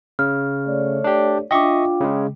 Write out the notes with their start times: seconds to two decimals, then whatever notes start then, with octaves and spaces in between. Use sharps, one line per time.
0.19 C#3 F6
0.66 A3 C#5 D5
1.04 D4 G4
1.51 D4 F4 D#5 E5 G5 C#6 D6
2.01 C#3 G#3